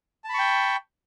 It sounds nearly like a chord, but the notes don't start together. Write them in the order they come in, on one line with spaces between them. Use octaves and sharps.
A5 B5 C#6 G5